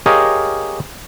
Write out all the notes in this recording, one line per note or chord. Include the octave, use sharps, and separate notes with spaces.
G4 G#4 A#4 C#5 D#5 F5